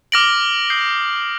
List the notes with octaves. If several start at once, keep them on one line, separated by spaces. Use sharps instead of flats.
D6 F6 A#6 D7 F#7
D#6 G6 C7